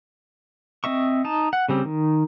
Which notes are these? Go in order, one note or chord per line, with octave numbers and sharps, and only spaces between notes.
C4 D#5 E5 C#6
D#4 A5
F#5
C#3 G3 C4
D#3